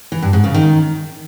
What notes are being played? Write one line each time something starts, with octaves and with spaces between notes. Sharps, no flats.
E3
G2
G#2
C#3
D#3